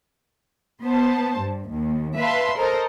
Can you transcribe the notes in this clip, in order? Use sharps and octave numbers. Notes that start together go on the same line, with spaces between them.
B3 C5 A5
G2
D#2
B4 E5 F5 A5 B5 C6
A4 A#4 C5 D#5